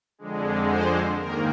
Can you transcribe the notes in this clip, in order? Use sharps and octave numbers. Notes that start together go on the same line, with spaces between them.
F2 D3 G#3
C5
G#2 D#3 A#3 A#4